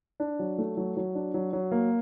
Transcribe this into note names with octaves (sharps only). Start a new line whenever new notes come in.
D4
F#3
A3
F#3
F#3
D4
F#3
F#3
A#3